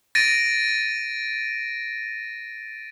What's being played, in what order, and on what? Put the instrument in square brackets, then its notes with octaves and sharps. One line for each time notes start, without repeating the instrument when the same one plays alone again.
[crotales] A6 A#6 D7 D#7